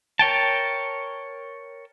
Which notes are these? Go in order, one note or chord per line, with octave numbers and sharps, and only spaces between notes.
A#4 C#5 G5 A5